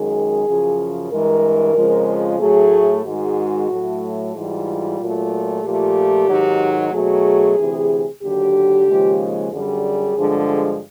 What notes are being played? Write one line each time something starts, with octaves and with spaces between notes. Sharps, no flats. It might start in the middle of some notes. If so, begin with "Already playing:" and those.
Already playing: F#2 D#3 G#3 G#4
F#2 C#3 F3
G2 E3 G#3 A#4
F2 C#3 F3 G#3
A2 F#3 A3 G#4
G#2 D#3 G#3 F#4
A2 F#3 A3
G#2 E3 G3 F4
A#2 F#3 A3
A#2 F3 A3 G4
G#2 D#3 F#3
B2 F#3 A3 G#4
D2 C3 E3
D#2 D3 F#3 G4
D#2 C#3 F3 G#3
F#2 D3 G3 G#4
G2 D3 F3 G#3